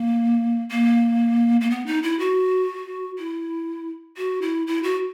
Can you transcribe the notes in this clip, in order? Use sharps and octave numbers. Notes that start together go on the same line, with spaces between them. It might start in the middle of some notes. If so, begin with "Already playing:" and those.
Already playing: A#3
A#3
A#3
B3
D#4
E4
F#4
E4
F#4
E4
E4
F#4